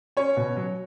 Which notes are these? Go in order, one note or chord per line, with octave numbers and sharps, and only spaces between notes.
C#4 C#5
B2
F#3